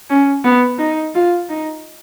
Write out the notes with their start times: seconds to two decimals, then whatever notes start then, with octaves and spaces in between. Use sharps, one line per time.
0.10 C#4
0.44 B3
0.78 D#4
1.15 F4
1.49 D#4